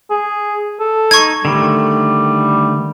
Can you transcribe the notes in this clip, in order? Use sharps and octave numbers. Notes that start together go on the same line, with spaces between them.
G#4
A4
D#4 C#6 G#6
D3 D#3 G3 A3